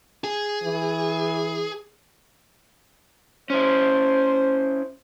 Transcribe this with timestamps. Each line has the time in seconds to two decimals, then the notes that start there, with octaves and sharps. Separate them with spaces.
0.24 G#4
0.63 E3
3.50 C#4 E4 C5